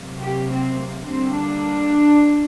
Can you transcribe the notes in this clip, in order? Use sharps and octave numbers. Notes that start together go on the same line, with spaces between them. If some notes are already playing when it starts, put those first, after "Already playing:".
Already playing: C3 F#3 A#3
G4
C4
A#3
D3 G3 A#3 C4
D4